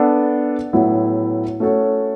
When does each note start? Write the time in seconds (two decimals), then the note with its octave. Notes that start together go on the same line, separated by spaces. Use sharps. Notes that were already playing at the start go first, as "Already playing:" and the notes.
Already playing: B3 D4 A4 D5
0.73 A2 F#3 B3 E4
1.60 A3 C#4 F#4 A4 C#5